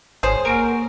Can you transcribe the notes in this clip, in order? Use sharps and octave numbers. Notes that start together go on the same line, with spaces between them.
G#1 G#4 C5 C#5 E7
A#3 A#4 F#5 G#5 C#6 D7